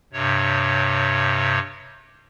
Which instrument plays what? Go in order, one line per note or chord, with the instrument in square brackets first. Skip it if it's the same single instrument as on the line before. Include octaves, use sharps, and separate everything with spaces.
[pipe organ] G2 C3 C#5